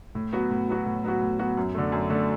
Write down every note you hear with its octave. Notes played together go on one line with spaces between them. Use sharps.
A2
F#3 B3 F#4
A2
F#3 B3 F#4
A2
F#3 B3 F#4
A2
F#3 B3 F#4
F#2
D3 A3
F#2
D3 A3